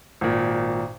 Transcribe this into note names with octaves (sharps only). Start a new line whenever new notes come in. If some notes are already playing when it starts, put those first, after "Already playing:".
G#1 A#2